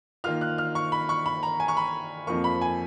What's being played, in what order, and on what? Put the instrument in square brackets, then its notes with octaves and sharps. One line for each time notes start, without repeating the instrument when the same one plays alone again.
[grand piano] D#3 A#3 F4 F6
F#6
F6
C#6
B5
C#6
B5
A#5
G#5
C#6
B5
F2 F3 A#3 C#6
B5
G#5